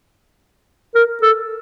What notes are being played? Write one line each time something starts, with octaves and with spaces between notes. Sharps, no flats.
A#4
A4